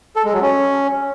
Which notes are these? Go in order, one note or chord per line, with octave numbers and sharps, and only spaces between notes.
A4
G#3
F#3
C#4